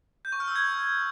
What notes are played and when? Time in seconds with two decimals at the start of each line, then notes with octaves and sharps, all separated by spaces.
0.25 G6
0.32 C#6
0.40 F6
0.48 E6
0.56 G#6